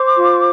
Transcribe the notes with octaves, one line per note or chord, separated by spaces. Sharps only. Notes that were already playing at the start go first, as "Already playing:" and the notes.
Already playing: C5 D6
F4